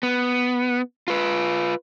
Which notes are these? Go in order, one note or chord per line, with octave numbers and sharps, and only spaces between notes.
B3
F4 B4